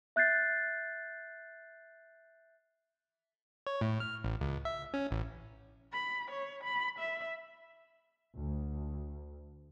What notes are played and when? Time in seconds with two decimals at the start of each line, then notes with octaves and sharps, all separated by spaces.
0.16 E5 F#6 G6 A6 C7
3.67 C#5
3.81 A2
4.00 F6
4.24 A1
4.41 C#2
4.65 E5
4.94 C#4
5.11 A1
5.93 B5
6.31 C#5
6.64 B5
6.99 E5
8.37 D2